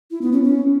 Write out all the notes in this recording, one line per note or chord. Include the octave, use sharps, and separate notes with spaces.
E4
B3
C#4
C#4